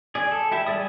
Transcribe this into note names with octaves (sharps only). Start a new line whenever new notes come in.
G#4 D5
A4
E4 G4 E5
G3 G4 G#4 D5 D#6